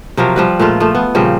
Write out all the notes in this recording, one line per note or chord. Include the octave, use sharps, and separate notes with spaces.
C3 F3 F#3 A#4
F3 G3 B4
A#2 G#3 A3 F4
F3 A3
B3
A#2 C#3 F3 G3